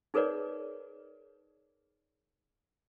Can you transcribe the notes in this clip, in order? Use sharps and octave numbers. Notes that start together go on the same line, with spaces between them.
D#4 G#4 A#4 B4 C#5 D5